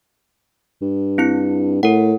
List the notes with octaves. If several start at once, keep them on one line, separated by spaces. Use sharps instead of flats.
G2
C4 E4 C#7
A2 A#4 F#5